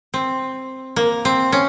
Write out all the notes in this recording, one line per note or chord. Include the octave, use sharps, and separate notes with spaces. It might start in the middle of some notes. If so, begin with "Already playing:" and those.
C4
A#3
C4
C#4